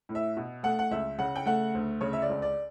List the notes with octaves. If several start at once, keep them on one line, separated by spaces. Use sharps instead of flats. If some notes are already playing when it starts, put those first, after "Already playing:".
A2
E5
B2
A3 F#5
F#5
C#2 E5
C#3 F#5
G5
A3 F#5
D2
C#3 C#5
E5
D5
C#2
D5